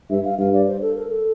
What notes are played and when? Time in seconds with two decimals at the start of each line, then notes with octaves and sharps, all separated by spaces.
0.10 G2 E5
0.25 F5
0.39 G2 F5
0.53 D5
0.67 C5
0.82 A4
0.95 A#4
1.10 A4